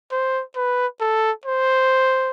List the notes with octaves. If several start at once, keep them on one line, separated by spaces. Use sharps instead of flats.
C5
B4
A4
C5